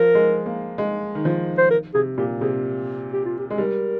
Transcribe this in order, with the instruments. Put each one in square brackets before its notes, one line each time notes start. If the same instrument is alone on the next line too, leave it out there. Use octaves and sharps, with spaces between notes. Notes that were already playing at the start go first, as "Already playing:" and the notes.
Already playing: [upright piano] F3 [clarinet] A#4
[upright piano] G#3
A#3
G#3
D#3
F3
[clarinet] C5
A#4
[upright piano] C3 [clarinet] G#4
[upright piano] A#2 [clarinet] G4
[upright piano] C3 [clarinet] G#4
[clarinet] G4
F4
G4
[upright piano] G#3
[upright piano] G3 [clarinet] A#4